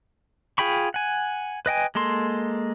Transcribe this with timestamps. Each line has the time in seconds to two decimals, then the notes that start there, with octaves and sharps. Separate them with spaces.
0.58 F4 G#4 G5 B5 C#6
0.94 F#5 G#5
1.66 B4 D#5 G5 G#5
1.95 G#3 A#3 A4 C6